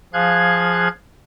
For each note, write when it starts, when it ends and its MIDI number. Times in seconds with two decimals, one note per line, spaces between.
0.13 0.88 53
0.13 0.88 68
0.13 0.88 77
0.13 0.88 90
0.13 0.88 92